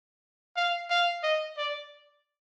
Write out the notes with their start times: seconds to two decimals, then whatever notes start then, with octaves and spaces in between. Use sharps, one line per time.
0.56 F5
0.90 F5
1.23 D#5
1.57 D5